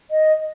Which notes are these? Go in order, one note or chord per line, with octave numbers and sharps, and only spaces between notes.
D#5